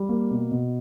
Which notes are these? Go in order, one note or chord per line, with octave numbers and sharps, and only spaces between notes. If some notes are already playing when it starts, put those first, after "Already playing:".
Already playing: G3
A#3
B2
B2